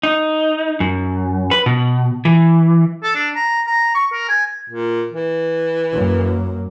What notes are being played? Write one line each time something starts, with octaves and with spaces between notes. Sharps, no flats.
D#4
F#2
B4
B2
E3
A4
D4
A#5
A#5
C#6
A#4
G#5
A#2
E3
F#2 A#3